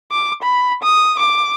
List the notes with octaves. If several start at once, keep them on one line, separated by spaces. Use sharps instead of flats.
D6
B5
D#6
D6